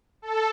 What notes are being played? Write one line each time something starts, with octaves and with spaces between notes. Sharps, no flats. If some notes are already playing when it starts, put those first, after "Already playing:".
A4